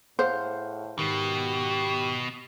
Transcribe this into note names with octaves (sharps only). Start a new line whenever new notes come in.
A2 G#4 C5 F5 F#5
G#2 B2 D#3 G4